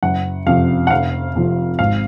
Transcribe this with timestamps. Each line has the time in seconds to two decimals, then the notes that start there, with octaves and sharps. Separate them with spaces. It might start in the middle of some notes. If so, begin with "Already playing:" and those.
0.03 F#1 F#5
0.46 F2 C3 F3 F5
0.87 F#5
0.90 F1 F5
1.35 F2 C3 F3
1.79 G#1 F5